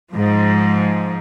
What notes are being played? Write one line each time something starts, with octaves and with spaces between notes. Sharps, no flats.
G#2 F3